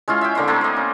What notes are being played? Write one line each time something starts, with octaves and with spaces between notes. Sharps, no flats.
G#3 C#4 E4 F4
E5 G5
D3 A#3 C5 C6
A3 A#3 C4
C5 D#5
C#4